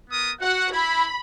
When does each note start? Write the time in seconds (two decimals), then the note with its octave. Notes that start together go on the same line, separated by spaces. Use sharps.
0.10 B3 A#4 D#6
0.41 F#4 F#5
0.72 E4 B5